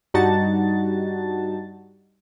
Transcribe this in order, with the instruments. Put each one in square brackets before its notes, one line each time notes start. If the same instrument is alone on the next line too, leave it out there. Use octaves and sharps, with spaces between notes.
[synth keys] G2 G3 D#4 F#4 A5 A6